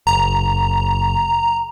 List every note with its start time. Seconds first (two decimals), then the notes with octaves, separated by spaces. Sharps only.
0.07 F#1 A#5